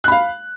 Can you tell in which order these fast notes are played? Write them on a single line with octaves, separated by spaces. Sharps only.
F#6 B5 F5